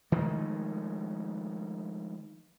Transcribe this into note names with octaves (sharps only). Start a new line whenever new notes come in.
D#3 F3 G#3 A3